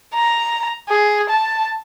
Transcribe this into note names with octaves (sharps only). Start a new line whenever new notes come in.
A#5
G#4
A5